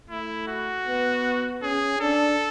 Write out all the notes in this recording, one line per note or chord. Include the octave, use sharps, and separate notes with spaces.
A3 E4
F#4
B3
C#4 G#4
D4 A4